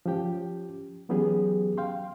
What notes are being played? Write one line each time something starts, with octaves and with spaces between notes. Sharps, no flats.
F3 C#4 G4 G5
E3 F#3 B3 C#4 G4 G#4
F5 G5 C6